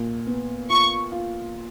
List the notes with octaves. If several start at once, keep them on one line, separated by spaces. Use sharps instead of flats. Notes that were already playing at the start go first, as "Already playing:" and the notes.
Already playing: A#2
B3
F4 C#6
F4